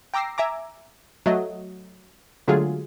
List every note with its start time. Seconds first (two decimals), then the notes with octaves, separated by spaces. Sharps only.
0.14 G5 A#5 D6 E6 A#6 C7
0.38 E5 G#5 A#5 D6
1.26 F#3 A3 D#5
2.48 D3 F#3 G#3 A3 F4 G#4